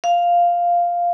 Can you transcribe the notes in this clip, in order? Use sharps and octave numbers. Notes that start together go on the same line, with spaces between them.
F5